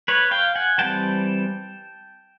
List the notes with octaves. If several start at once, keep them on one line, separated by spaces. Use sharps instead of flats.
B4 C#5
F5 G5
F#5 G#5
E3 G3 C4 G5 A5